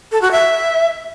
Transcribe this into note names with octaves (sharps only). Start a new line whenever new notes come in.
A4
F#4
E5